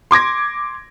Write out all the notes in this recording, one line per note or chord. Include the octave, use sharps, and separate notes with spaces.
C6 D6 G#6 A#6